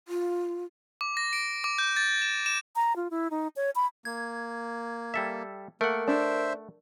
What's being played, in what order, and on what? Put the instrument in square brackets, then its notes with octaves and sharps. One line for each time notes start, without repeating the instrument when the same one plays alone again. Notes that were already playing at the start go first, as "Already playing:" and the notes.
[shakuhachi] F4
[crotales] D6
A#6
D7
D6
G6
A6
E7
E7
[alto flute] A#5
F4
E4
D#4
C#5
B5
[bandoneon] A#3 [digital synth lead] G#6
[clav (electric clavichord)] G3 A4 E5
[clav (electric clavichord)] A3 F#5 [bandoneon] A#3 [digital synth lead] A#4
[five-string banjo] D4 [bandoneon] C5 E5